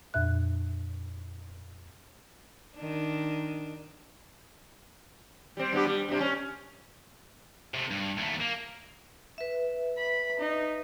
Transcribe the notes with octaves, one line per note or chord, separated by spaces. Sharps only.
F2 A#2 E5 F#6
D#3 D4
G3 C4
G2 B3 G4
G3
G2 C3
C#4
C3 A3
G2
D#2 A3
A#3
B4 E5
B5
D#4